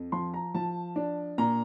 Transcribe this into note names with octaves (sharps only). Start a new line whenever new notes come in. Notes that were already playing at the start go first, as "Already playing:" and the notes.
Already playing: F2
F3 C6
A#5
F3 A5
D4
A#2 A#5